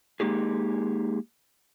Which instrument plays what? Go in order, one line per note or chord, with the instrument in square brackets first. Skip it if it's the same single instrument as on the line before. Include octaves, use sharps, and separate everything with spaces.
[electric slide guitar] G#3 A#3 D#4 G4 G#4